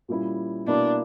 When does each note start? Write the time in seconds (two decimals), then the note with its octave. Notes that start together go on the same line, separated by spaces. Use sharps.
0.08 A#2 G3 C#4 E4
0.67 B2 A#3 D4 E4